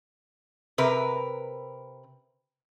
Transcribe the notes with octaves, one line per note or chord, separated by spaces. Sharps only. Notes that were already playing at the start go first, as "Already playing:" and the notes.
C3 A#4 B4